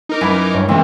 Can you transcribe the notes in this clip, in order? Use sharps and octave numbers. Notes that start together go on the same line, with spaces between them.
D#4 A#4 D6
F#2 E3 B5
G2 C#5
C#3 E3 G#3 A#3 C4